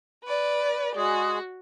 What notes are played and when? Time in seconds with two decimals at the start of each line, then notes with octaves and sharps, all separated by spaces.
0.25 B4 D5
0.96 G#3 F#4 G#4